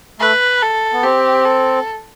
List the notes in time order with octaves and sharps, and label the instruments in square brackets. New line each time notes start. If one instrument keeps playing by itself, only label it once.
[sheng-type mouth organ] A3 [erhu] B4
[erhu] A4
[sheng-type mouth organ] B3
[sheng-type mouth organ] C4 [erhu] G4
[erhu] A4